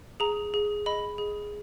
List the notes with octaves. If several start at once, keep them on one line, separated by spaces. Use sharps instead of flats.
G#4 A#5
G#4
D#5 B5
G#4